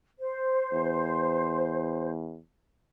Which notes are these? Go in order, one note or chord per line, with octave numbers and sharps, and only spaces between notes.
C5
E2